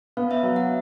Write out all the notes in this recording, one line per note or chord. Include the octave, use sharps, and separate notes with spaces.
B3 F5
E5
F#3
F#5